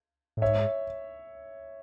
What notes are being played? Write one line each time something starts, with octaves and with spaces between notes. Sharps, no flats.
A2
G#2 C#5 E5